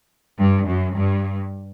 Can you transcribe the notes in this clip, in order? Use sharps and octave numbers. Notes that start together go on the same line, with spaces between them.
G2
F#2
G2